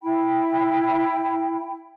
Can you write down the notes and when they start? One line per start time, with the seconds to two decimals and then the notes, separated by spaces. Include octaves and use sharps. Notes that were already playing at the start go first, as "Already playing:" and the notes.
0.02 E4 G5 B5